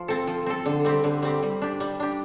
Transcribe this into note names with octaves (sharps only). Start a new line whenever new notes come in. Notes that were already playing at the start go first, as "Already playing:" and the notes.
Already playing: F3
C4 A4
F3
C4 A4
D3
G3 C4 G4
D3
G3 C4 G4
G3
D4 G4
G3
D4 G4